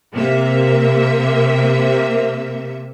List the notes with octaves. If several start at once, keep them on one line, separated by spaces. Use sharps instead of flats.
C3 A#3 E5